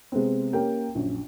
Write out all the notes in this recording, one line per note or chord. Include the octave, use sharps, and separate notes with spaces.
C3 G#3 B3 C4
A#3 C#4 G4 A#4 G5
A#1 F#2